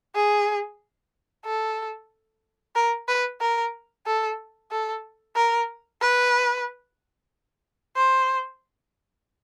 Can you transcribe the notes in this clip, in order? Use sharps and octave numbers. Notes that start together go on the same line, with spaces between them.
G#4
A4
A#4
B4
A#4
A4
A4
A#4
B4
C5